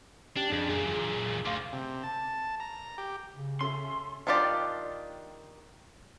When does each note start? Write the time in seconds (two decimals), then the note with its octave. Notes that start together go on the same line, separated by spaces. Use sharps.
0.36 C#4 D4 G4 G5
0.50 F2 D4 G#4
0.69 F#2 A#2 G#4
1.46 D2 F5 C6 D6
1.73 C3
2.03 A5
2.60 A#5
2.98 G4
3.35 C#3
3.61 C#4 A4 E5 C6
4.27 D#3 D4 F4 G4 D5